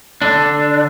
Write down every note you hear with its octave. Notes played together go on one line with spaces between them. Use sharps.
D3 D4